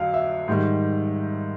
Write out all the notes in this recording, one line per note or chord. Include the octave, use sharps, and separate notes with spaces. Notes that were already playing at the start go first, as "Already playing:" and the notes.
Already playing: F2 D3 F#3 F5
E5
G#2 D#3 G3